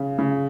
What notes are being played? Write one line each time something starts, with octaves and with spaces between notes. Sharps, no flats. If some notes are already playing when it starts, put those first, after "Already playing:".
Already playing: C#3
C#3